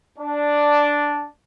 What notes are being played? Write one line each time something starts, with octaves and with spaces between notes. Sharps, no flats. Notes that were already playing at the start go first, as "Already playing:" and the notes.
D4